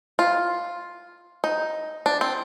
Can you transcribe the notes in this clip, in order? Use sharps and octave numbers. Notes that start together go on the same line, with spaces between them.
F4
D#4
D4
C4